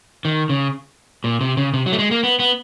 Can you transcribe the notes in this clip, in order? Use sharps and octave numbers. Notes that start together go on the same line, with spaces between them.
D#3
C#3
A#2
C3
C#3
C3
F#3
A3
G#3
A#3
B3
B3